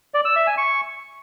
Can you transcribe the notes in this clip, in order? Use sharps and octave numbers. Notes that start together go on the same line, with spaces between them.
D5
E6
E5
G#5
C#6